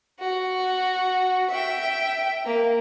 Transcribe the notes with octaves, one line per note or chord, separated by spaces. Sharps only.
F#4
E5 G5
A#3